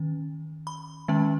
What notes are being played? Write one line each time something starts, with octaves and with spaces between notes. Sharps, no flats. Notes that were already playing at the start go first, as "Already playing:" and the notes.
Already playing: D#3 C#4
B5
D#3 G#3 C#4